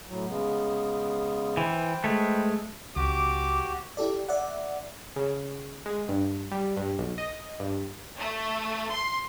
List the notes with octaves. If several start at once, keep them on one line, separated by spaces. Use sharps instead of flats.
A2 F#3
C#3 G#3 B3
E3 B4 C5 G5
G#3 A3
C#2 F#4 G4 D6
E4 G4 A4 D5
D5 E5 F#5
C#3
G#3
G2
G3
G2
B1
D#5
G2
A3
C6